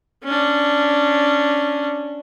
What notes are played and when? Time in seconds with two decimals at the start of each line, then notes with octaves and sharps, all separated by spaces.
0.24 C#4 D4